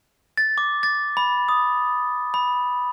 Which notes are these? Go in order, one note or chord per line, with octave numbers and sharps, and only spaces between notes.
A6
D6
A6
B5
D#6
B5